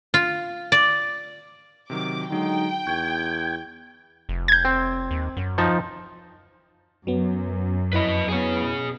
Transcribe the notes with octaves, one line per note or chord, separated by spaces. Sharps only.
F4
D5
C3 D#3 F#3 D6
D3 F#3 G#3 D#4 G5
E2 C#6 G6 G#6
F1
G6 G#6
C4
D#2
F#2
F3 D#4 A5
F#2 F#3 B3
F2 E4 B4 D#5 B5
F#3 B3 G#4 C#5
B2